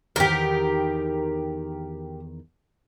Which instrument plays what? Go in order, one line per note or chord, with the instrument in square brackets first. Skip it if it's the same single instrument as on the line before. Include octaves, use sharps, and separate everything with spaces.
[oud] E2 D#3 [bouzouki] G4 A#4